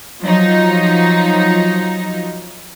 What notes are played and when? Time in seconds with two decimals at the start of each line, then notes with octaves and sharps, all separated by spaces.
0.22 F3 F#3 D#4